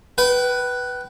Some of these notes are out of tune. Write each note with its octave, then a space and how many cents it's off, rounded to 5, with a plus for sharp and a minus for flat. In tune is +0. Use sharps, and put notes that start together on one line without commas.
B4 +0 G5 -35